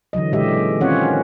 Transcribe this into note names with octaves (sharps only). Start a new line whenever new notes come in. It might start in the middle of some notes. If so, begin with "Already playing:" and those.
D3 E3 F#3 D#5
A#2 C#3 G#3 G4 D#5 E5
D#3 C4 C#4 F4 C#5 F#5